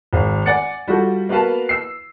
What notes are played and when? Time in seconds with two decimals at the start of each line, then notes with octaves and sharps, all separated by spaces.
0.13 G#1 F5
0.46 D5 F#5 G#5 A6 C#7
0.88 G3 F4 F#4 A4
1.29 A#3 B3 F#4 B4 F5 A5
1.69 E6 C7